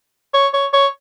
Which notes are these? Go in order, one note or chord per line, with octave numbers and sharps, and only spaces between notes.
C#5
C#5
C#5